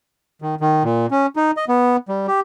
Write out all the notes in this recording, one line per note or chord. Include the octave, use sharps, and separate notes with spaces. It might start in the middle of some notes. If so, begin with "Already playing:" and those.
D#3
D#3
A#2
C#4
D#4
D#5
B3
G3
G4